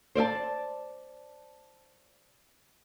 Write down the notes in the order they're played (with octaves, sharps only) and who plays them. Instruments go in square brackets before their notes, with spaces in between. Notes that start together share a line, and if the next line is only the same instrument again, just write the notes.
[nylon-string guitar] C5 D5 E5 A5